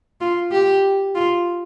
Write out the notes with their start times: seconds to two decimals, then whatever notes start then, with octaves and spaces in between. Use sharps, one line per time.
0.21 F4
0.51 G4
1.15 F4